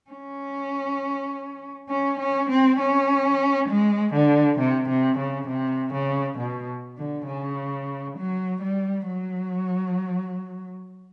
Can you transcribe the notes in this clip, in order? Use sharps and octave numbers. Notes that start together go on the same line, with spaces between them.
C#4
C#4
C#4
C4
C#4
G#3
D3
C3
C3
C#3
C3
C#3
B2
D3
C#3
F#3
G3
F#3